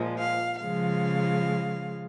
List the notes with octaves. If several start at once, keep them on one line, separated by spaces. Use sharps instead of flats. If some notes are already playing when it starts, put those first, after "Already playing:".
Already playing: A#2 F3 G#3
F5
C#3 F3 G#3 F5